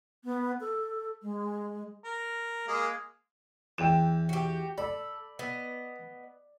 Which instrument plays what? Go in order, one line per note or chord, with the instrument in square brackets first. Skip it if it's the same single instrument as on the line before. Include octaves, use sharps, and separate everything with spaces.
[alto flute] B3
A4
G#3
[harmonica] A#4
G#3 A#3 G#4
[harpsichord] E2 [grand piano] G5 E7
[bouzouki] F#4 G4
[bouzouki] A4 [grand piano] D5 [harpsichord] B5
[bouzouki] B3 D#5